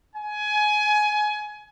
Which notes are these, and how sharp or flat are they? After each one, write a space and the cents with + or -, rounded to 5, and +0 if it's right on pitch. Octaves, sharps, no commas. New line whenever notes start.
G#5 +20